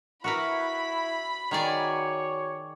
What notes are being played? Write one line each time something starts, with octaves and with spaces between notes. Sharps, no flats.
E4 F#4 A#4 B4 B5
D#3 F#4 G#4 C#5 D5